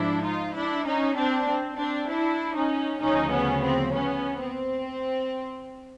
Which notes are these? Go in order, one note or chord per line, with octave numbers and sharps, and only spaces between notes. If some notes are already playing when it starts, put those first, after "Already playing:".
Already playing: G#2 F3 D4 E4
D#4 F4
D4 E4
C#4 D#4
C4 D4
C4
C4 D4
D4 E4
C#4 D#4
D2 C#3 F3 C#4 D#4
B3 C#4
C4
B3 C#4
C4